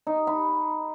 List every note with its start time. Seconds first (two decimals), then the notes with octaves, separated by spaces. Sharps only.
0.07 D#4
0.27 B5